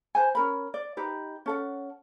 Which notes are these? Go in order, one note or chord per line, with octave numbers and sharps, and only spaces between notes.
B4 C5 G#5
C#4 A#4 B5
D5
D#4 G4 B4
C#4 A4 F#5